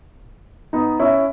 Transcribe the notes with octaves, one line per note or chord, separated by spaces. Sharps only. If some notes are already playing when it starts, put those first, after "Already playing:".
B3 D#4
C#4 E4